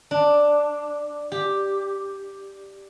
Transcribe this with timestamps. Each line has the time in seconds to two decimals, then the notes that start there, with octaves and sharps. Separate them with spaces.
0.11 D4
1.32 G4